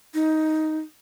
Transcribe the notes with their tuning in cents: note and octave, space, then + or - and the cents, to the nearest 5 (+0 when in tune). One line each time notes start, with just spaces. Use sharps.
D#4 +10